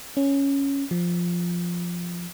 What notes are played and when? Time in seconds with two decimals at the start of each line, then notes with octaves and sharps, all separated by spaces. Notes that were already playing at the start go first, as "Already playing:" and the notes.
0.17 C#4
0.91 F3